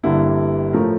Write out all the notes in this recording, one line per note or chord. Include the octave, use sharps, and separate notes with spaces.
G1 G2 D3 G3 A#3 E4
A2 F3 A3 A#4